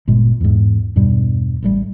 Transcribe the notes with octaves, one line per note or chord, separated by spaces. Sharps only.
G1 A#2 G#3
E2 G#2
E2 G2 B2 G3
A1 A2 G3